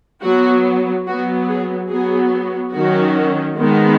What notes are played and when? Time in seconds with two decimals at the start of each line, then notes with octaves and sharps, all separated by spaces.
0.23 F#3 B3 F#4
1.07 F#3 B3 F#4
1.48 G#4
1.90 F#3 B3 G#4
2.74 D#3 F#3 C#4 F#4
3.57 D#3 G#3 B3